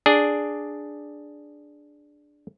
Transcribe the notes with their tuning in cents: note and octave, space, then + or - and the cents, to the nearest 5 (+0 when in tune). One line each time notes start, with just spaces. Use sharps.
D4 +0 G#4 +0 D5 +0